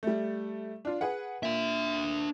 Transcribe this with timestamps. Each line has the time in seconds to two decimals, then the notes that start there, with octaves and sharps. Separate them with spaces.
0.03 G3 A3
0.85 D4 F4
1.01 G#4 B4 F#5
1.43 A#2 D4 E5